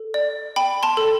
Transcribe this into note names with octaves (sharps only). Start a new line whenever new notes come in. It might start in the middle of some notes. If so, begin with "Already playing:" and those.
Already playing: A4
D5
G5 B5
A5 C6
A4